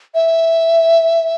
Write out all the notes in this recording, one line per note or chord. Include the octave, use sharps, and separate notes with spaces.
E5